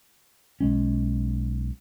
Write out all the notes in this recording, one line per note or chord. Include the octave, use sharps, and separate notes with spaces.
B1 G#3 C#4